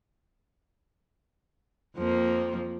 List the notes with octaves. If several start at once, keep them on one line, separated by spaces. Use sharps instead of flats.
F2 F3 A#3